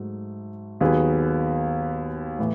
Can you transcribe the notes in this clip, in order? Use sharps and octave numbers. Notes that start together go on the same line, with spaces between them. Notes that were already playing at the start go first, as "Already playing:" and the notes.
Already playing: G#2 F#3 A3
D#2 D#3 F#3 B3 G#4 B4
A2 E3